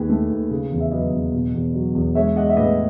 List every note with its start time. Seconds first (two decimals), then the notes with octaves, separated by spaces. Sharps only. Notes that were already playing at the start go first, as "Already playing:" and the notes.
Already playing: D#2 D#3 G#4 B4
0.09 A3
0.31 D#2
0.50 C#3
0.71 E2
0.81 E5
0.91 F#3 B4 D#5
1.12 E2
1.33 B2
1.54 E2
1.74 F#3
1.94 E2
2.15 G#3 C#5 E5
2.36 G#3 D#5 F#5
2.50 E5
2.56 A2 B4 D#5